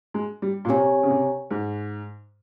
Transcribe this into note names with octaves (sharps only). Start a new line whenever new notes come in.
G#3
G3
A#2
C3 C4 G4 C#5 G#5
C#3
C3
G#2